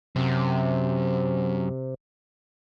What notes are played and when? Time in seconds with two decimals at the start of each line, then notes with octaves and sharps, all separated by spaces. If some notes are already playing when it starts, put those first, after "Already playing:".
0.16 F#2 C3